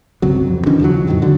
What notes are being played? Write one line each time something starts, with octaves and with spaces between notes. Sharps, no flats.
G1 C#2 C3 F#3
F2
D#3 E3 C#4 D4
D#2 C#3 F3 F#3
F2 A2 D#3 F#3
D3 F#3